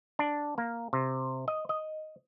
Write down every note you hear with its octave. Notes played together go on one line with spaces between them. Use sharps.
D4
A#3
C3
D#5
D#5